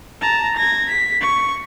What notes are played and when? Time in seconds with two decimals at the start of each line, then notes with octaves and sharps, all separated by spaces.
0.21 A5 A#5
0.57 G#6 A#6
0.89 B6
1.21 C#6